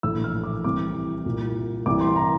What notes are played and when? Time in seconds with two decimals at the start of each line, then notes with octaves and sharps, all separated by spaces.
0.03 A#1 A2 E3 E6
0.24 F6
0.43 D6
0.64 C2 C3 E3 D6
1.26 C2 A#2
1.86 C2 C3 E3 D6
2.01 C6
2.16 A#5